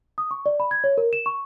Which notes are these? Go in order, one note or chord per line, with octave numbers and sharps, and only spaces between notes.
D#6
C#6
D5
B5
G#6
C#5
A#4
E7
C#6